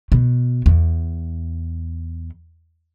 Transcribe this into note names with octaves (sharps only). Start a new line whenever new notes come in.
B2
E2